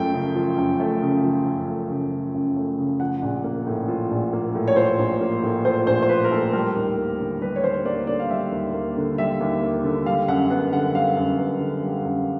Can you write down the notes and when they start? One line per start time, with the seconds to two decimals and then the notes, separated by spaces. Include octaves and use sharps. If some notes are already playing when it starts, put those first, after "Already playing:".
Already playing: F#2 F3 A3 G5
0.13 C#3
0.35 F3
0.58 F#2
0.80 A3
1.02 C#3
1.24 F3
1.46 F#2
1.68 A3
1.90 C#3
2.12 F3
2.34 F#2
2.56 A3
2.78 C#3
3.00 F3 F#5
3.22 A#1
3.44 A#3
3.67 A2
3.88 F3
4.11 A#1
4.33 A#3
4.55 A2
4.68 C#5
4.76 F3 C5
4.99 A#1
5.21 A#3
5.43 A2
5.65 F3 C5
5.87 A#1 C5
6.02 C5
6.09 A#3 B4
6.24 A#4
6.31 A2 A4
6.53 G3 A#4
6.75 D#2
6.97 A#3
7.19 D3
7.41 G3 B4
7.56 C#5
7.64 D#2 C5
7.85 A#3 D5
8.07 D3 D5
8.20 F5
8.30 G3 E5
8.52 D#2
8.74 A#3
8.96 D3
9.18 G3 E5
9.40 D#2
9.62 A#3
9.84 D3
10.06 G3 F5
10.28 F#2 F#5
10.50 B3 F#5
10.73 D3 F#5
10.94 G3 F5
11.17 F#2
11.39 B3
11.60 D3
11.83 G3
12.05 F#2